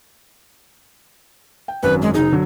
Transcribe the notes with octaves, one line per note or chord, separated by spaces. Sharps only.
G5
G#1 F#2 B4
G#3
F#1 D#4 G#4
D3 F#3